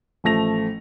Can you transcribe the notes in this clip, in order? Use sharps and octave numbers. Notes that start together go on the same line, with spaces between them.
A1 F3 A3 A#6 F7